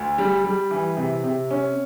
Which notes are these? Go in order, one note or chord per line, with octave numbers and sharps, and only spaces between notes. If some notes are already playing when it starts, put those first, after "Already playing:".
Already playing: D2
G3
G3
E3
C3
C3
C#4